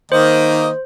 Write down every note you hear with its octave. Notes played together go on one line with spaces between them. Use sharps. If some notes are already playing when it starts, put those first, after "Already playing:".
D#3 A#3 C5 D#5